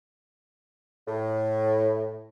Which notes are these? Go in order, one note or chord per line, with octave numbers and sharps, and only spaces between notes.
A2